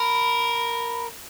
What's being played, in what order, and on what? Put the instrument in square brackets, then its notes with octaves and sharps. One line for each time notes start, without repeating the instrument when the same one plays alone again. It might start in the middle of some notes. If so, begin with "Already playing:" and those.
Already playing: [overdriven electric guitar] A#4 [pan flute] B5